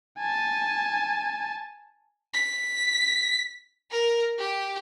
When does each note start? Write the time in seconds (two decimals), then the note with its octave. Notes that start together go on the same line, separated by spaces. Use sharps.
0.19 G#5 A5
2.34 B6
3.91 A#4
4.39 G4